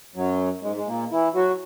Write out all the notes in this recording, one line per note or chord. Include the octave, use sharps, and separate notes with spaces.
F#2 F#3
G#2 G#3
G#3
A#2 A#3
E3 E4
F#3 F#4